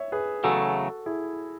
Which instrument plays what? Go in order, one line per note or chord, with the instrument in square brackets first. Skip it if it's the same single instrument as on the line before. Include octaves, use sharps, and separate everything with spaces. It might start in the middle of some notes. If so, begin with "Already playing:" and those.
Already playing: [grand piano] C#5 E5
G#4 B4
[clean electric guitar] E2 C#3 F#3 A3 [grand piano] F#4 A4
[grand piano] E4 G#4